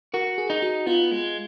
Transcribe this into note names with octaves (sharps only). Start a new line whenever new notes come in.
F#4 A#4
G#4
D#4
F#4
B3 F4
G#3